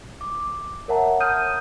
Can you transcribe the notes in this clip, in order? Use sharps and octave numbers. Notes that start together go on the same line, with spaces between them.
D6
A#4 C#5 E5 F#5 A5 A#5
D#6 F6 G6 D#7